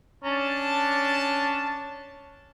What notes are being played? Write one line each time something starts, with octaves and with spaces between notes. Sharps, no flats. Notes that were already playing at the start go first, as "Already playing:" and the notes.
C#4 D4 A5